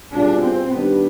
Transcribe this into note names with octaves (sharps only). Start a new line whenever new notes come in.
B2 G3 B3 D4 F4 G#4
C4
D#3 G3 B3 D4 G4 B4